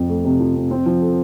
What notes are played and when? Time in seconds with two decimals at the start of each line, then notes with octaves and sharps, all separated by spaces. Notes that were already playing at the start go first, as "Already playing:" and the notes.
Already playing: F2 F3
0.09 A3
0.25 C3
0.40 F3
0.55 F2
0.71 C4
0.86 F3
1.02 A4